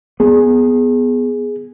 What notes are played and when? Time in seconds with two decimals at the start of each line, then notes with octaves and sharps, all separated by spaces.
0.20 B3 G#4